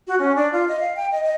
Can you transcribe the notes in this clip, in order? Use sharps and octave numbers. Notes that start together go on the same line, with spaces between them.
F#4
C#4
D4
F4
D#5
F5
G5
D#5
D#5